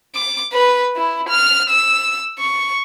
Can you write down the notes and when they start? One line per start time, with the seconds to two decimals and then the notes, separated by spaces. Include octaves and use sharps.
0.15 D6
0.53 B4
0.97 E4
1.29 F6
1.70 E6
2.39 C#6